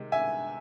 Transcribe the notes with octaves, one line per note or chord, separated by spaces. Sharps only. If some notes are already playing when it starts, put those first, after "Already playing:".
Already playing: C3 D#3 G#3
E5 G#5